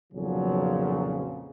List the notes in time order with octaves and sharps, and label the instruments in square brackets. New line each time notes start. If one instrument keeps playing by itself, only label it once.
[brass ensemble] B1 F2 A#2 C#3 F3 F#3